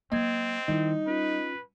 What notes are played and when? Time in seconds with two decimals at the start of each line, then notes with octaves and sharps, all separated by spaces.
0.12 F#3 A#3 C4 D#5 G#6
0.68 D#3 G3 D#4 E4
1.07 C#4 F4 B4